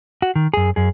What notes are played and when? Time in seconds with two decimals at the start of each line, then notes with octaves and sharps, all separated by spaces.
0.22 F#4
0.36 D#3
0.54 F#2 G#4
0.76 F#2 G#4